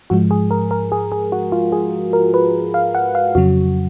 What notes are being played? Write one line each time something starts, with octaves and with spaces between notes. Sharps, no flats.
G#2 F3 G#3 F#4
G#4
A#4
A#4
G#4
G#4
F#4
F4
G#4
A#4
B4
F5
F#5
F5
F2 C#3 F#3 F#4